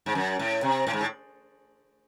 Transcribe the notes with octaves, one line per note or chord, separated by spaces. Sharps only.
G#2
F#2
A2
C3
A2
G#2
A2